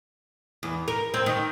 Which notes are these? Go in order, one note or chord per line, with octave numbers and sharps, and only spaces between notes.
E2
A#4
C4
D#3